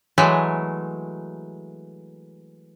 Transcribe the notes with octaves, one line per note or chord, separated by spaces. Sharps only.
E3 F#3 G#3 A3